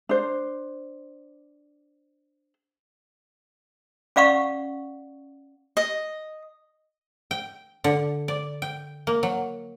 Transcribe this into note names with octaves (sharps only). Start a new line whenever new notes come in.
D4 C5
C#4 D5 F5 F#5 C#6
D#5
G5
D3
D5
G5
A#3
F#3